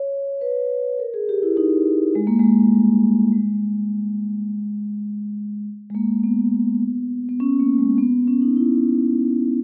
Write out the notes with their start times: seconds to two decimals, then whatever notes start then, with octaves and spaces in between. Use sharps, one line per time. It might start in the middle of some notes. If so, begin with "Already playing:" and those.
Already playing: C#5
0.41 B4
0.99 A#4
1.14 G#4
1.29 G4
1.43 E4
1.57 D#4
2.15 G#3
2.27 A#3
2.39 G#3
2.74 G3
3.32 G#3
5.90 G#3
5.95 A#3
6.23 B3
7.29 B3
7.40 C#4
7.60 A#3
7.79 G#3
7.98 B3
8.27 C#4
8.42 D#4
8.57 E4